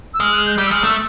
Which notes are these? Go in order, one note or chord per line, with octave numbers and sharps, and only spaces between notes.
E6
G#3 F6
F#6
G6
G3 G6
E6
G#3 F6
A3 E6